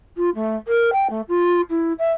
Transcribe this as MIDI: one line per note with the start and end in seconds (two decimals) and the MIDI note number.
0.17 0.30 65
0.34 0.56 57
0.67 0.90 70
0.92 1.07 79
1.09 1.21 57
1.28 1.61 65
1.70 1.93 64
1.98 2.12 76